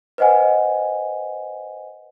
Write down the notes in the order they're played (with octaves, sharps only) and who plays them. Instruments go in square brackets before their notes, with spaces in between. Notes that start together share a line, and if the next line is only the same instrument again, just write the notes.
[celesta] B4 C5 D#5 F#5 G#5